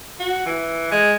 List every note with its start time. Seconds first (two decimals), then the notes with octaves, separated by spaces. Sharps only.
0.20 F#4
0.46 E3
0.91 G#3